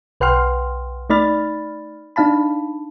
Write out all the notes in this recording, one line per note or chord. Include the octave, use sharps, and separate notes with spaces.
B1 B4 F#5 G5 C6 F6
A3 D#4 D5 B5 F6 A6
D4 D#4 F5 A5 B5